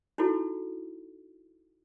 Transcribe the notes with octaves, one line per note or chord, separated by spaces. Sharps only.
D#4 E4 F#4 A4